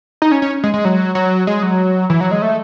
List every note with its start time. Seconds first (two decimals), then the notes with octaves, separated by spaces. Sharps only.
0.22 D#4
0.32 C#4
0.42 C#4
0.64 G#3
0.74 G#3
0.85 F#3
1.15 F#3
1.47 G#3
1.63 F#3
2.10 E3
2.21 F#3
2.31 G#3
2.42 A3